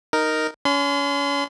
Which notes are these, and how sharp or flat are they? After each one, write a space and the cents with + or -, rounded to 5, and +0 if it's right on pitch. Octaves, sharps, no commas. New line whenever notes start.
D#4 +0 A#4 +0
C#4 +30 C6 -40